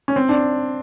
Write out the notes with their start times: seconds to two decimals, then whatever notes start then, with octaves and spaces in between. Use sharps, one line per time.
0.08 C#4
0.16 C4
0.29 D4